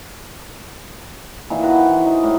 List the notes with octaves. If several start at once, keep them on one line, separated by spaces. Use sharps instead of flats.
A#2 D#3 E3
F#4 B4
C5
E3
D#4
A2